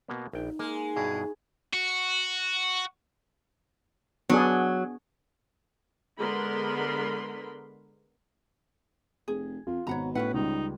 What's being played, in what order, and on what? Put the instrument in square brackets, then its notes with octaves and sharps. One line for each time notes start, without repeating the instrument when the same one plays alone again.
[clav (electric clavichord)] B2 A#3 B3
[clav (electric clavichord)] A#1 G5 [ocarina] D#4
[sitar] G#3 [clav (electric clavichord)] A#3
[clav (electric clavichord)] G2 B2 E4 [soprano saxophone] G#4
[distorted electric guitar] F#4
[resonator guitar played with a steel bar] F#3 [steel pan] B3 D4 G#4
[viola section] D3 G#3 B3 A#4 B5 C6
[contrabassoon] F1 [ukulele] G#4
[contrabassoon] F2 [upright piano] F4
[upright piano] G#1 B5 [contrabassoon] B2 [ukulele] C#5 F#5 A#5
[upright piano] A2 [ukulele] C#4 F4 F#5 [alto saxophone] B4
[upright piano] C#2 G3 [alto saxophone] D#4